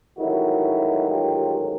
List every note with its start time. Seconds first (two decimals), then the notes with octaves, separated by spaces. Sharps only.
0.18 A1 G#2 D#3 F#3 E4 F#4
1.10 F4 G4